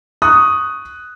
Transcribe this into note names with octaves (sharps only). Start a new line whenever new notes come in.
C#6 D#6 F#6